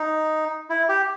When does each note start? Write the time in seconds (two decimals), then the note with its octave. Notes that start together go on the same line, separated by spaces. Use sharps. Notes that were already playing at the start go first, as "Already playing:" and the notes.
Already playing: D#4
0.70 E4
0.89 G4